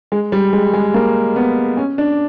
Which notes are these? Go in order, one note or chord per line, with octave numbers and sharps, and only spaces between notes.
G#3
G3
G#3
G#3
A#3
B3
C#4
D4